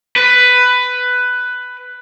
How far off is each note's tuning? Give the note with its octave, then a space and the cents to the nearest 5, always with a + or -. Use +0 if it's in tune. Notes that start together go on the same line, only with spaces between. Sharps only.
B4 +10